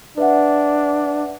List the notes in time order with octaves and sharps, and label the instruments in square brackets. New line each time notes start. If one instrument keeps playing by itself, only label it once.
[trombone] D4 [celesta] B4 E5 F#5